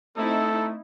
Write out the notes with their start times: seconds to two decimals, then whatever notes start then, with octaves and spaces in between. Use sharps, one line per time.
0.18 A3 C4 D#4 E4 A4